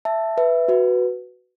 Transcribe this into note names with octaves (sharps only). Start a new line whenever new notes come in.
E5 A5
B4 E5
F#4 B4